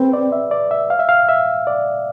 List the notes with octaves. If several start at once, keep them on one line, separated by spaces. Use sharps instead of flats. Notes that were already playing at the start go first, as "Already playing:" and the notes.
Already playing: C4 G#4 B4
D5
E5
D5
E5
F5
E5
F5
E5
D5